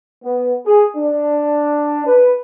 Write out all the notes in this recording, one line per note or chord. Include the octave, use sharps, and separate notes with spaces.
B3
G#4
D4
B4